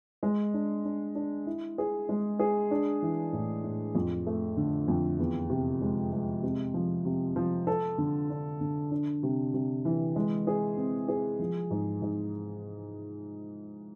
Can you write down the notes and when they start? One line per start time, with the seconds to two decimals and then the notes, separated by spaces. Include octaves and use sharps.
0.23 G#3
0.54 D4
0.85 D4
1.15 D4
1.46 E4
1.78 G#4
2.09 G#3
2.39 G#4
2.71 D4
3.02 E3
3.33 A2
3.64 A2
3.95 F2
4.27 A3
4.57 D3
4.88 F2
5.19 E2
5.50 C3
5.82 G#3
6.12 G#3
6.43 C3
6.74 F3
7.05 C3
7.36 F3
7.67 A4
7.98 D3
8.30 D4
8.61 D3
8.91 D4
9.23 C3
9.54 C3
9.85 E3
10.16 G#3
10.47 G#4
10.77 C4
11.09 G#4
11.39 F3
11.71 G#2
12.02 G#2